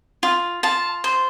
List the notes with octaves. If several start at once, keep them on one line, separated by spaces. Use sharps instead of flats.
F4
F4 A5
C5